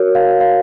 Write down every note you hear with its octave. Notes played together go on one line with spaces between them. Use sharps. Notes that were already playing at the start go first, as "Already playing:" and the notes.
Already playing: F#4 A#4 C#5
F5
F5